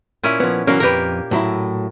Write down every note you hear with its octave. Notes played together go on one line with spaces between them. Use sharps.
A#2 C#4 E4
F3 B3
E3 F#3 A#3 C#4
F2 G4 A#4 B4
A2 F#3 E4